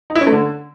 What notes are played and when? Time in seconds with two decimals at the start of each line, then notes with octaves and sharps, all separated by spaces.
0.10 D#4
0.15 E4
0.21 C#4
0.27 A3
0.32 D3